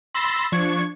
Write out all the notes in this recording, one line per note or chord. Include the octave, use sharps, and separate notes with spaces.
B5 C6 E6 A6 A#6
F3 D4 C#6 G#6